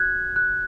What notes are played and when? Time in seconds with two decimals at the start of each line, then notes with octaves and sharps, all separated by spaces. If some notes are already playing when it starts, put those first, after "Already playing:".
Already playing: F#4 F#6 G#6
0.36 F#6